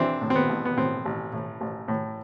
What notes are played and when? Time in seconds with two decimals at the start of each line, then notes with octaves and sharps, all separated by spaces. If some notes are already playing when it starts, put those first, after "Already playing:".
Already playing: E3 C4 D4 E4
0.21 A2
0.30 C4
0.35 B3
0.49 A1
0.65 B3
0.77 A2 C4
1.05 A1
1.33 A2
1.61 A1
1.88 A2